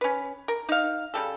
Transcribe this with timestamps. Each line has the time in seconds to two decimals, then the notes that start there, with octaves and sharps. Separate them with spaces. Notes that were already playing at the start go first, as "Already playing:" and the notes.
0.01 C#4 B4
0.48 A#4
0.69 D#4 F5
1.14 C#3 G3 A4